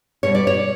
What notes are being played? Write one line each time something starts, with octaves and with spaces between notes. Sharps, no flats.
B2 G3 C#5
D5
C#5